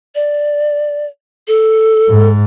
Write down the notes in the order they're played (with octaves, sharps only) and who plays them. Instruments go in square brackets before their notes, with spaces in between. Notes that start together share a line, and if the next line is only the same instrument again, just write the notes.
[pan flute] D5
A4
[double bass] G#2